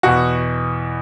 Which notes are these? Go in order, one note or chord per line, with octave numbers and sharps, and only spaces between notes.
E2 B2 F#4